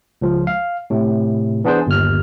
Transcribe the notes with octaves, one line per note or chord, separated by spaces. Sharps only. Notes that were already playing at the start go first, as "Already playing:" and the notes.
C#2 F3
F5
A2 C3
E3 B3 D4 G#4 C5
G1 D#2 F6